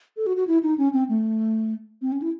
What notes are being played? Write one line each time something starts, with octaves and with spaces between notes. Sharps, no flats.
A4
F#4
F#4
E4
D#4
C#4
C4
A3
C4
C#4
E4